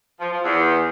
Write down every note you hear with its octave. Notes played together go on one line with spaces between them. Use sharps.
F3
F3
E2